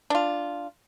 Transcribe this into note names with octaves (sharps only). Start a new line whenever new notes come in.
D4 F4